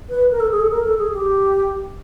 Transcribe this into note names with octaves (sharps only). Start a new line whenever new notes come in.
B4
A#4
A4
G#4
A4
A#4
A4
G#4
G4